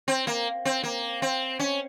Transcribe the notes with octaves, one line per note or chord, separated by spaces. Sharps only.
C4
A#3
C4
A#3
C4
C#4